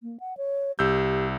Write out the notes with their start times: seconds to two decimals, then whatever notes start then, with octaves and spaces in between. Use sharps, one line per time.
0.03 A#3
0.20 F#5
0.37 C#5
0.79 C2 G4 E6 G6